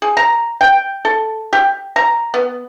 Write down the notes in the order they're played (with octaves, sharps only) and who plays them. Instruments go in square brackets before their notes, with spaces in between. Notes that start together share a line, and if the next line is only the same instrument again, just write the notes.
[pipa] G#4
A#5
G5
A4
G4
A#5
B3